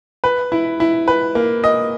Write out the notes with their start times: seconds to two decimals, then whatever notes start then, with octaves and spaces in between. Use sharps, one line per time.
0.24 B4
0.52 E4
0.80 E4
1.08 B4
1.35 A#3
1.64 D#5